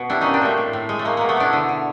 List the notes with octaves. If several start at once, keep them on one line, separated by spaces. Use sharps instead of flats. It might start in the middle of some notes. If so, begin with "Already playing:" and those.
Already playing: B2
G3 D4 E4
A#2 C#4 D#4
C4 D4
A#2 A3
A2
A2
G#3
A3
G#3 A#3
B2 A#3
A3 B3
B2 D4 E4
D3
D3